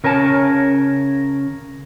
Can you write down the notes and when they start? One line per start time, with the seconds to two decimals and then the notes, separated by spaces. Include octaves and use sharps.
0.04 C#3 A#4 C#5 G#5 A5